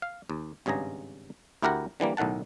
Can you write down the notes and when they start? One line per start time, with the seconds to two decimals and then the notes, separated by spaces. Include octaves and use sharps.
0.02 F5
0.30 D#2
0.66 G#1 G2 C#3 G#4 A#5
1.62 D2 E4 G4 A#4 F#5 A#5
2.00 D3 E3 G3 A#3
2.17 B1 A2 D#3 F#5 A5